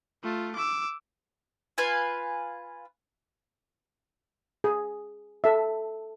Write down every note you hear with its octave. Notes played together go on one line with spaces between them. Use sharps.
A3 F4
D6 E6
F4 B4 G#5
G#4
A4 E5